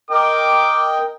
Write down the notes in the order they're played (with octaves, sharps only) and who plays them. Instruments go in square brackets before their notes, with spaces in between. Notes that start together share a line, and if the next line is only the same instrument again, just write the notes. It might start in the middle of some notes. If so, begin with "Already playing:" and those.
[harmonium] A#4 D#5 G5 [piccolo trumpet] D6